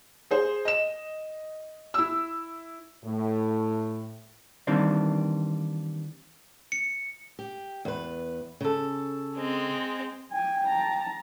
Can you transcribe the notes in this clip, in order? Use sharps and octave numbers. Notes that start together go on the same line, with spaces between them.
G#4 C5
D#5 E7
E4 E6
A2
D#3 E3 G3 A#3 C4 D4
C#7
G4
E2 B4
C#3 A4
G#3 C4
G5 G#5
A5 A#5